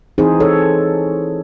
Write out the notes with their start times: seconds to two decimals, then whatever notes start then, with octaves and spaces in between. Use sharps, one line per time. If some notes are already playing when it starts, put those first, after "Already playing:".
0.18 E3 C4 D#4 G#4 C5
0.40 A4 C#5